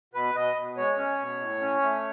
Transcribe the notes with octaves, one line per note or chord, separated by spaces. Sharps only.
B2 B4
B2 D#5
B2
G#3 C#5
C#4
B2
A2
C#4
A3